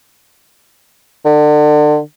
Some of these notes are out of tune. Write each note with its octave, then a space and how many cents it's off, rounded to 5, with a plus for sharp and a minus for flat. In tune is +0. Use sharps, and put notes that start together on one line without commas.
D3 +35